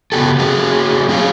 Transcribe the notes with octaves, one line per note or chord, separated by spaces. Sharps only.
C#3 B3 F#4 G4 A4
F#3 G#4
C4 G#4 F5